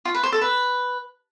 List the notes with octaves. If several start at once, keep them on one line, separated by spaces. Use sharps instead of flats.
F4
B4
C5
A4
B4